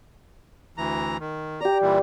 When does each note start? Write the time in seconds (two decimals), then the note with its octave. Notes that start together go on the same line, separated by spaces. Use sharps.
0.78 D2 E3 A#5
1.20 D#3
1.61 G4 D5 A#5
1.82 A#2 E3 G3